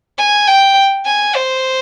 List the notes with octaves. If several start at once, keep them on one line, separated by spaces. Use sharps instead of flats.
G#5
G5
G#5
C5